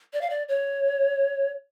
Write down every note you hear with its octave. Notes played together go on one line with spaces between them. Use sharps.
D5
F5
D5
C#5